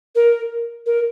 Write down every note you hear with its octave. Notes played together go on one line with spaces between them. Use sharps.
A#4
A#4